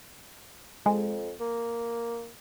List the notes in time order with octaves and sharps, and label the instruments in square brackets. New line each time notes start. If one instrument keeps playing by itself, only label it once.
[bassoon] F2 [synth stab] G#3
[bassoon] A#3